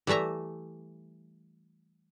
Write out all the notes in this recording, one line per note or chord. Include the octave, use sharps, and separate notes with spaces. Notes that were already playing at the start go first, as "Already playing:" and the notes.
E3 G3 A3 E5 A#5